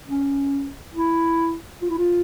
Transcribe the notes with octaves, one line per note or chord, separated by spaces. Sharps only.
C#4
E4
F4
E4
F4